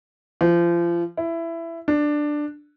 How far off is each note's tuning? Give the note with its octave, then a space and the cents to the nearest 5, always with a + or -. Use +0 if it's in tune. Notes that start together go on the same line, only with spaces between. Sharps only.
F3 -30
E4 +15
D4 +10